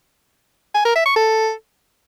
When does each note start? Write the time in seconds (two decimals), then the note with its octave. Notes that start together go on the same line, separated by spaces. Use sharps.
0.75 G#5
0.85 A#4
0.95 E5
1.06 C#6
1.16 A4